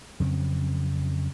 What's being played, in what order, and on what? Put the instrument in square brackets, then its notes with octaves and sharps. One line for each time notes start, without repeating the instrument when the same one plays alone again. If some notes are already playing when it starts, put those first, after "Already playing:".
[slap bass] F2 C#3 F#3 C4